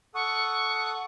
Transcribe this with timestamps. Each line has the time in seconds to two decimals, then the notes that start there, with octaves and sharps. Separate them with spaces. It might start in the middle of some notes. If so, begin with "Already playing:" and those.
0.14 A4 F#5 C#6 D#6